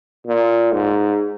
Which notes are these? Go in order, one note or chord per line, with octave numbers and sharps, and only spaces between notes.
A#2
G#2